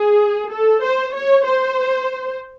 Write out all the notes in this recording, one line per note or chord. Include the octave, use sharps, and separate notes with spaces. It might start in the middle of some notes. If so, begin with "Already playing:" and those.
Already playing: G#4
A4
C5
C#5
C5